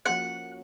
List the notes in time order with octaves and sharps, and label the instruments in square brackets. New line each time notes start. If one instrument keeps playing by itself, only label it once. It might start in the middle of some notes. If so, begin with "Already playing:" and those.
[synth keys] F3 A#3 C#4 F#4 [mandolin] F#5